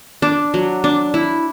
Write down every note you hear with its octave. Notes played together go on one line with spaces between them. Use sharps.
D4
F#3
D4
E4